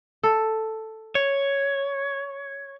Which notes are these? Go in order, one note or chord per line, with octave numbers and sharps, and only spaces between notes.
A4
C#5